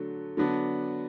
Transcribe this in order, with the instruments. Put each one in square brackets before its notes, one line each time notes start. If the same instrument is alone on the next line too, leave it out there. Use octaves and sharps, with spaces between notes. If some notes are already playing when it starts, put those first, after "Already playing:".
Already playing: [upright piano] D3 F#3 A3
D3 F#3 B3 D4